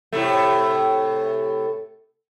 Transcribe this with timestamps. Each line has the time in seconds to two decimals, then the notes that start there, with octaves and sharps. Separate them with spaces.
0.12 A2 C3 A3